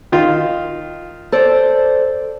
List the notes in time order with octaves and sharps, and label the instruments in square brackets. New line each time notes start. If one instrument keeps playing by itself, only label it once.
[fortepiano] D#3 F4
[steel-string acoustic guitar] A4 C5 D5